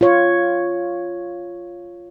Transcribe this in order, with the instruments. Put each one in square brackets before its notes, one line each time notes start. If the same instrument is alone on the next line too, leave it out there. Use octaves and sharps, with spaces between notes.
[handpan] F4 C#5